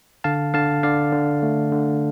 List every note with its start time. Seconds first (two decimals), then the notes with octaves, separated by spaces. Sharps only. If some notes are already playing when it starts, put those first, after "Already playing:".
0.24 D3 F5 A5
0.54 D3 F5 A5
0.83 D3 D5 F5
1.13 D3
1.43 A3
1.72 D3